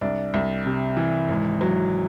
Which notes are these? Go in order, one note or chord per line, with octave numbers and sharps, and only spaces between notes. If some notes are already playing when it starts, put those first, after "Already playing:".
C2 D4
C2
C3
E3
G#1
F#3